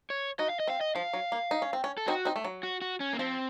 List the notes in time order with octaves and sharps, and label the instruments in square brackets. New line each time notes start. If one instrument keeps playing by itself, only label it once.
[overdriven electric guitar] C#5
[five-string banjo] D#4 F#4 [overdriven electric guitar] D#5
[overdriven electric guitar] F5
D#5
[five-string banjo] C4 [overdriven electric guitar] F5
[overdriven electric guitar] D#5
[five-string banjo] F3 [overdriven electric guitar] F5
[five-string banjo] F#3
A#3
D#4
C#4
C4
C#4
[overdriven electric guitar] A4
[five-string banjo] C4 D#4 [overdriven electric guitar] F#4
[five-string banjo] C4 D#4
A3
F#3
[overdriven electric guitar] F#4
F#4
C#4
A#3
[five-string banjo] F3 [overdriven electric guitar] C4